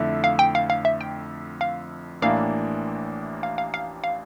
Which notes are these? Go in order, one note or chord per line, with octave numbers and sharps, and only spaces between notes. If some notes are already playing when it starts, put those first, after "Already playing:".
Already playing: F2 D3 A3 E4
F5
G5
F5
F5
E5
G5
F5
A1 A2 E3 A#3 D4 F5
F5
F5
F5
F5